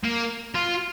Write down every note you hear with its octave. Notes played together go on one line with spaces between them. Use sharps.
A#3
F4